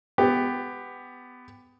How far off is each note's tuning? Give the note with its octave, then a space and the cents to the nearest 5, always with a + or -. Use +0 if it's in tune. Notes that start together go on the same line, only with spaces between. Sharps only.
B3 +20 G4 +15